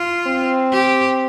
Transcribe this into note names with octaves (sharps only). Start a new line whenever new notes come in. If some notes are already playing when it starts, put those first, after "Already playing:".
Already playing: F4
C4
G4